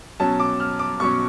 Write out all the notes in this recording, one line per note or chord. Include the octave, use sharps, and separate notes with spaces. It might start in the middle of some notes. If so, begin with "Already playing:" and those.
B2 F#3 C#4 A5
D6
F6
D6
B2 F#3 C#4 C#6